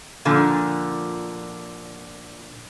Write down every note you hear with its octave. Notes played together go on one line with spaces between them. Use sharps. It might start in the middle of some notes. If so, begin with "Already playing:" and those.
A#2 D3 F3